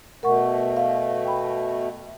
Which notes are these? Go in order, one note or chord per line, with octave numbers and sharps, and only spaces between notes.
B2 A3 A#4 F#5 C#6
F5
G5 B5